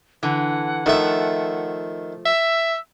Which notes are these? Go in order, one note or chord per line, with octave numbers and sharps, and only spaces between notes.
D3 E3 F#5
D#3 F3 A3 E5
E5 E6